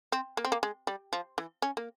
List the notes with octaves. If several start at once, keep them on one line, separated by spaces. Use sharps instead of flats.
C4
A#3
C4
A#3
G#3
G3
F3
E3
C#4
A#3